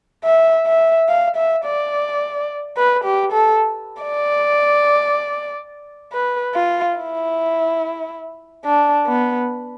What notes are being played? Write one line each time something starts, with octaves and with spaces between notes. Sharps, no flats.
E5
E5
F5
E5
D5
B4
G4
A4
D5
B4
F4
E4
D4
B3